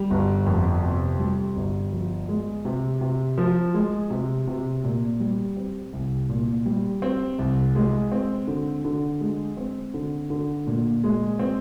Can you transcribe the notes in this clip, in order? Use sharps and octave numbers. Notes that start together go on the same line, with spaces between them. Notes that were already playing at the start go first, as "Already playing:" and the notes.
Already playing: G3
G1
F2
C3
G3
G1
F3
G#3
C3
C3
F3
G#3
C3
C3
A#2
G3
C4
C2
A#2
G3
C4
C2
G#3
C4
D3
D3
G#3
C4
D3
D3
A#2
G#3
C4